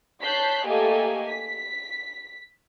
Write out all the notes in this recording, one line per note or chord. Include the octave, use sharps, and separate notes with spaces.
C#5 A5 F#6 G6 B6 C7
A3 A#3 G4 A4 D#5 G#5
B6